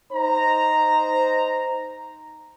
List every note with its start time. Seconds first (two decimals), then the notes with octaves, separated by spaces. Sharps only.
0.13 D#4 C5 A#5